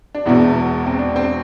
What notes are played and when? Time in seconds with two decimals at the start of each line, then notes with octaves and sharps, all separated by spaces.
0.15 D4
0.26 E1 E2 B2 E4
0.86 C4
0.99 D4
1.16 C4